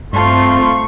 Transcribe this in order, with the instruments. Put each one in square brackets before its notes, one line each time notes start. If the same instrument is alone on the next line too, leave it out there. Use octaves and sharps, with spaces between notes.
[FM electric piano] G2 A5 [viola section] A3 C4 [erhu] F4 [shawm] C#6